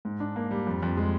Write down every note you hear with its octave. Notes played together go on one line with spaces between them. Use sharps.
G#2
D4
A#3
G3
F2
F2
G#3